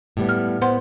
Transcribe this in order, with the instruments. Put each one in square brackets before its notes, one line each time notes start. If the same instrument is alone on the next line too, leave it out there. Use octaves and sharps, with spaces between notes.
[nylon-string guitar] A2 G3 B3
[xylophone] F6
[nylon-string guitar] B3 [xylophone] C5 F#5 C6